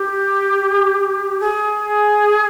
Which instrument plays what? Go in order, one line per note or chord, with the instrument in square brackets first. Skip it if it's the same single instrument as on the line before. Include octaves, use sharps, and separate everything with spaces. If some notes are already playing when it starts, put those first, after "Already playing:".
Already playing: [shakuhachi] G4
G#4